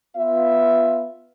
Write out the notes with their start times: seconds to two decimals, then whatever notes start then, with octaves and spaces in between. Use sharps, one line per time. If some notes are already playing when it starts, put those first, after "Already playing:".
0.16 B3 F4 E5